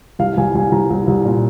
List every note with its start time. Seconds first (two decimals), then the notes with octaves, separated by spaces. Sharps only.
0.19 C2 F5
0.33 F5
0.37 C2 G#5
0.55 C2 G#5
0.71 C2 A#5
0.90 C2
1.07 C2
1.25 A#2